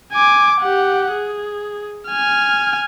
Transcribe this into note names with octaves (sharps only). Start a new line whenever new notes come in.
G#5 D6
G4 F#5
G#4
G#5 F6